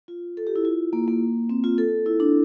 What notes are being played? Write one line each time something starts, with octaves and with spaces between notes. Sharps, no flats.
F4
A4
G4
E4
F4
A#3
A#3
C4
F4
A4
E4
D4